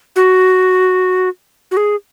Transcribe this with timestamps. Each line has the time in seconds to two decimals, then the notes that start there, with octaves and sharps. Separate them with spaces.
0.16 F#4
1.71 F#4
1.77 G#4